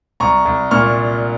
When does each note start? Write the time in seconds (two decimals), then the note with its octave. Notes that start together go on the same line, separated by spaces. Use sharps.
0.20 C2 A#5 C#6
0.45 C2
0.71 A#2 C#6 F6